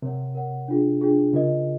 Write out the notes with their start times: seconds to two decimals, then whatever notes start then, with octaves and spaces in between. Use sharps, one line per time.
0.02 C3 A#4 C#5 F#5
0.35 A#4 C#5 F#5
0.68 D4 F4 G#4
1.01 D4 F4 G#4
1.33 C#3 F4 A#4 D#5